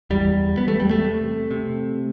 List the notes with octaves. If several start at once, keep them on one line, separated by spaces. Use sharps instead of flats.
E2 G3
E2 B3
A3
G3
A3
C3
C3